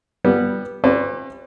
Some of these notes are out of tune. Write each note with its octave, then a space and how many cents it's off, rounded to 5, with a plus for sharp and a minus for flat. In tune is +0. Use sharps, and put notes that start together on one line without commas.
G3 +0 B3 -20
C#4 -45 B4 +30 D5 +0